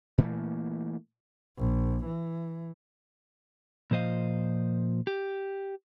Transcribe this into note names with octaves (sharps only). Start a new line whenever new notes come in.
A#2 E3 A3 A#3
A#1
E3
A#2 F3 C5 D#5 F5
G4